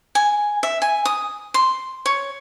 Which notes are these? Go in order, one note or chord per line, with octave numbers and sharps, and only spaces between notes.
G#5
E5
G#5
D#6
C6
C#5